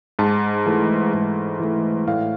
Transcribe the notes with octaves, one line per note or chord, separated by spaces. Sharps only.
G#2 A5
E3 A3
G#2
E3 A3
A2 F5